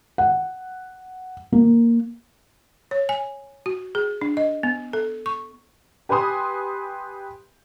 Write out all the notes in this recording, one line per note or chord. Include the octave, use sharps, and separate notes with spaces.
F#5
A#3
C#5
G#5
F#4
G#4
D4
D#5
B3
A4
C#6
G4 B4 G#5 B5 C6 D#6